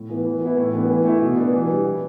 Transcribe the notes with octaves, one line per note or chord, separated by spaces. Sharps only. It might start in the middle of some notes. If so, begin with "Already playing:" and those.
Already playing: A2
E3 B3 E4
E3
B3 E4
A2
E3 B3 D4
E3
A3 E4
B2
B3 D4
E3
G3 D4
E3